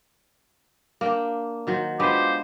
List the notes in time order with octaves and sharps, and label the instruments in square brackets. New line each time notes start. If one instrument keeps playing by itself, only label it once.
[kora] A#3 D4 G5
D#3 F#3 C5
[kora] G#3 B3 D4 [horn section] F4 G4 C5